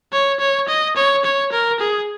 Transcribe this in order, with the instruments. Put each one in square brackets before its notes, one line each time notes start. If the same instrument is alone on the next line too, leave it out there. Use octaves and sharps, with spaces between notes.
[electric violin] C#5
C#5
D#5
C#5
C#5
A#4
G#4